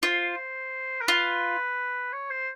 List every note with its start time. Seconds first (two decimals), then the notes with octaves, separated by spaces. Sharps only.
0.03 F4 C5
1.01 A#4
1.07 F4 B4
2.13 C#5
2.30 C5